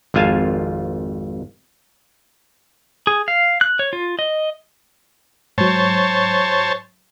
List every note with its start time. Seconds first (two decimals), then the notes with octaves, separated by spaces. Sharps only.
0.14 G#1 F2 F4 F5 G#5 A5
3.07 G#4
3.28 F5
3.61 F#6
3.79 C#5
3.93 F4
4.19 D#5
5.58 G#2 F#3 C5 C#5 A5